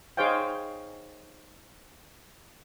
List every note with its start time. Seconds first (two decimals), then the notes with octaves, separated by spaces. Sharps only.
0.17 D#4 G#4 C5 C#5 F5 G5